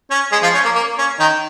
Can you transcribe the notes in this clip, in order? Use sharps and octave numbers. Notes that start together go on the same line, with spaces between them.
C#4
G#3 G#4
F3 F4
C#4
A#3
A#3
C#4
D#3 D#4